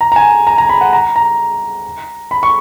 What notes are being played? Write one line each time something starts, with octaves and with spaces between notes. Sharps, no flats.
A#5
A#5
G#5
A#5
A#5
B5
F#5
A#5
A#5
B5
C#6